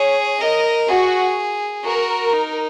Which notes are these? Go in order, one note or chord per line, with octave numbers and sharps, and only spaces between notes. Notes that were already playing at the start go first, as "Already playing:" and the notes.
Already playing: G#4 C#5
A#4 D#5
F#4 G#4
F#4 A#4
D#4